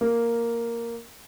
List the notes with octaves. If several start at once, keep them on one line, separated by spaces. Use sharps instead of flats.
A#3